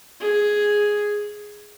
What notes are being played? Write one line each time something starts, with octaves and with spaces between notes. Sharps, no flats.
G#4